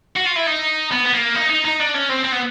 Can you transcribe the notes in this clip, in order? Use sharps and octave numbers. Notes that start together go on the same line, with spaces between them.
F#4
F4
E4
D#4
B3
B3
A#3
D#4
D#4
D#4
D4
C#4
C4
C4
B3